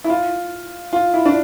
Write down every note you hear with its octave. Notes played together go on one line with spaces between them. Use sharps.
E4
F4
F4
E4
D4